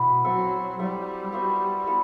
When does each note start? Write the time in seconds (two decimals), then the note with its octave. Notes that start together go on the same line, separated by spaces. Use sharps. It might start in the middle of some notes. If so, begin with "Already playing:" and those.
Already playing: B2 B3 E4 B4
0.24 F#3 C4 F#4 A4 E5
0.79 G3 E4 A4 E5
1.32 B3 F#4 C5 E5
1.87 B3 E4 A4